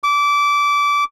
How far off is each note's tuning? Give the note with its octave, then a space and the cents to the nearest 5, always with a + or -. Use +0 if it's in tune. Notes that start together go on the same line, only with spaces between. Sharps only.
D6 -20